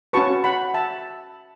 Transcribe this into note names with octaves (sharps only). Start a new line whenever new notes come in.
C#4 F#4 B4 A5 C#6
F#5 B5
E5 A5